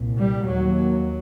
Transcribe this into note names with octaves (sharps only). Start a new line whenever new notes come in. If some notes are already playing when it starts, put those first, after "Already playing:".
Already playing: C2 A#2
G3
D#2 F#3